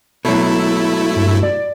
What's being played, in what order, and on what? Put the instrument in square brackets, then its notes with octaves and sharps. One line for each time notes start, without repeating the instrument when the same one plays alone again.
[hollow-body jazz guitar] B2 F#3 [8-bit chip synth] A3 E4
[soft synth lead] G2
D5